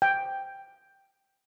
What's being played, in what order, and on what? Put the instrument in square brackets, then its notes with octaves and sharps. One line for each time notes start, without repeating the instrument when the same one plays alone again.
[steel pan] G5